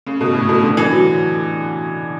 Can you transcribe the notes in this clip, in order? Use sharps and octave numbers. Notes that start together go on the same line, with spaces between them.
C#3
B2
A2
B2
D3
E3
F#3